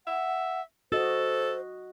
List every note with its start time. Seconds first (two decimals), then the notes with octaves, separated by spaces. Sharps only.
0.07 E5 F#5
0.92 F#4 A4 C5 D#5